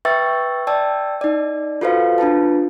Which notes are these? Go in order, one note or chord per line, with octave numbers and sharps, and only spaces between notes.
B4 E5 G5 C#6 E6 A6
D5 G5 A5 E6
D#4 D5
F4 F#4 A4 B4 C5 F5
D4 F4 B4 A5